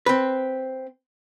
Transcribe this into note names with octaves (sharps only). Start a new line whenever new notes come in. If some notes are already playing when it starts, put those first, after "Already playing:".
C4 B4